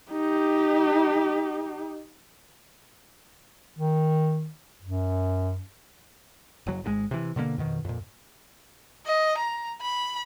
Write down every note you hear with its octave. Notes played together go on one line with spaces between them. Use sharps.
D#4 G4
D#3
F#2
F#1 F#3
G#1 B2 G#3
C3 E3
B2 D3 F#3 A#3
F2 B2 D#3
F2 A#2
D#5
A#5
B5